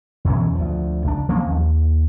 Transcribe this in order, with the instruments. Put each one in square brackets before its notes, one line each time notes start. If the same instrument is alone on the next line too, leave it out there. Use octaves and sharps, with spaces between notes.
[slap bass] E2 B2 E3 C#4
D2 F3
C#2 D4
F3 A#3 C4 C#4
D#2